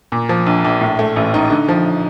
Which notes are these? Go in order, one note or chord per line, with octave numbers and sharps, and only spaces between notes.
A#2
F3
A#1
A#1
A2
A3
A1
D#4
D3
F3